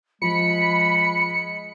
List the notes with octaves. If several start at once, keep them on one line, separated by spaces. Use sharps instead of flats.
F3 G#3 B5 C#7